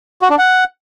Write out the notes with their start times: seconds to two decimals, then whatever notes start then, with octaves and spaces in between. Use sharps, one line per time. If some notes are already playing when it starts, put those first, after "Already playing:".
0.22 F#4
0.30 D4
0.38 F#5